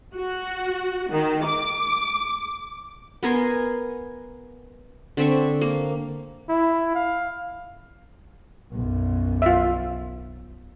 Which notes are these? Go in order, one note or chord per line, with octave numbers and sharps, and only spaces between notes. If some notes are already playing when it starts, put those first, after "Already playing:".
F#4
D#3
D6
B3 A#4 G#5 C6
D3 C4 E5 C#6
A#3
E4
F5
B1 F#2
F4 E5